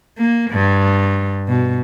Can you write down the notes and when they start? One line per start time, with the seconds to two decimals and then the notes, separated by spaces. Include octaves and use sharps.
0.18 A#3
0.51 G2
1.48 B2